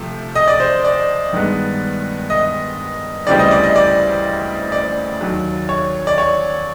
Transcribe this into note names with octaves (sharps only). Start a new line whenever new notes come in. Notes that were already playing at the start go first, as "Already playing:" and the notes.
Already playing: C3 F3 A3
D#5
D5
C5
D5
G2 D#3 G#3 B3
D#5
D2 C#3 E3 G3 C4 D5
D#5
D5
D#5
D5
D5
D#2 D#3 F#3
C#5
D5
C#5